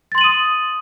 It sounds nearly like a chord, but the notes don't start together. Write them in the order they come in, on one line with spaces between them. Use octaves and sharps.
A6 C6 F#7 D#7 D#6